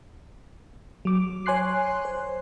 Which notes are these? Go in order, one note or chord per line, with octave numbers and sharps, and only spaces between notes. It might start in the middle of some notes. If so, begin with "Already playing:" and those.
F#3 D6
C#5 G#5 C6 F#6 C7
C5